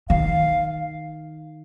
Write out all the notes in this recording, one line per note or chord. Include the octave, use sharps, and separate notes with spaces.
D#3 F5